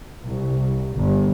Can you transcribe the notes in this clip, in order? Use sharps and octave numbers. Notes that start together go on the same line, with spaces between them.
C2
G1